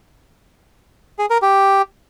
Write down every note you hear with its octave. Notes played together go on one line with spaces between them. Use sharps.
G#4
A#4
G4